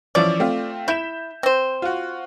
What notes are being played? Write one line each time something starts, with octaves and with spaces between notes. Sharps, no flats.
E3 F3 C#4 D5
A3 C4 F4
E4 G6 B6 E7
C4 C5
F4 F#4